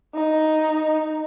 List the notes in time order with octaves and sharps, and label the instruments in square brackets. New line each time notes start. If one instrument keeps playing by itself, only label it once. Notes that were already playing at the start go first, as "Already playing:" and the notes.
[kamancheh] D#4